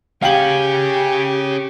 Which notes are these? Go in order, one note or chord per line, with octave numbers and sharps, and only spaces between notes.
C#4 G4 G#4 F5 G5 F#7